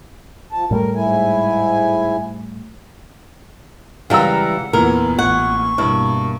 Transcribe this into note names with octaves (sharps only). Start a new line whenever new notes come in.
F3 A5
A2 G3 A3 A#4
G#2 E4 G#5
C#3 E3 G3 G#3 F5 F#5 A#5 E6
E2 A#2 E3 B3 A#4
A1 F#5 C#6
G2 B2 A#3 E4